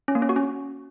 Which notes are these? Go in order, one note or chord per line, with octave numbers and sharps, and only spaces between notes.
C#4
A#3
C#4
F#4
C#4